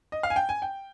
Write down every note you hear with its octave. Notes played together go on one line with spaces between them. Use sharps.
D#5
F5
G#5
G5
G#5
G5